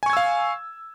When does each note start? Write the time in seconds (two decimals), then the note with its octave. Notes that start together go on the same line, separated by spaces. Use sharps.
0.03 G#5
0.06 C#6
0.10 G#6
0.13 E6
0.17 F5